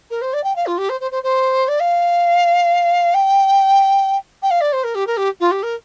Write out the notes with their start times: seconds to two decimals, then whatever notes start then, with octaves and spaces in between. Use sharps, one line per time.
0.10 A#4
0.21 C5
0.33 D5
0.43 G5
0.56 F5
0.66 F4
0.78 G4
0.89 C5
1.00 C5
1.11 C5
1.23 C5
1.68 D5
1.80 F5
3.14 G5
4.42 G5
4.50 F5
4.61 D5
4.72 C5
4.84 A#4
4.95 G4
5.07 A#4
5.17 G4
5.40 F4
5.51 G4
5.63 A#4